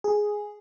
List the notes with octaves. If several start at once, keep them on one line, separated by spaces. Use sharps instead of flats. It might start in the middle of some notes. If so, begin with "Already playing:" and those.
G#4